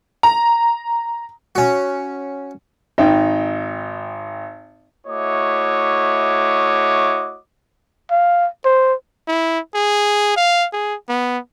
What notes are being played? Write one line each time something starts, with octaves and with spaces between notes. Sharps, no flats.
A#5
C#4 F#4
G#1 D#4 G5
A3 E4 F#4 C#5 D#5 D6
F5
C5
E4
G#4
F5
G#4
B3